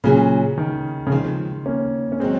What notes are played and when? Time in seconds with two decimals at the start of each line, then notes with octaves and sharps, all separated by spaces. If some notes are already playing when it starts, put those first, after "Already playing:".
0.04 A#2 C#3 F#3 C#4 G#4
0.58 D#3
1.07 C#3
1.11 D#3 F3 G#3 C4 F4
1.66 A#3 C#4
2.12 C#4
2.20 D#3 F#3 G#3 C4